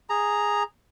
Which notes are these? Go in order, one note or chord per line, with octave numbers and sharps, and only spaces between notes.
G#4 A#5